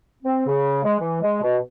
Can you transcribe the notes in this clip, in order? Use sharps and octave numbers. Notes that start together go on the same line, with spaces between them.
C4
C#3
G#3
E3
G#3
B2